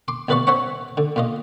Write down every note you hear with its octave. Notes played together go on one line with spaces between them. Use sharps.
C6 D6
C2 B2 B4 D5 F5 C#6
C5 C#5 E5 F#5 A#5 C#6
D3
A#2 F4 D#5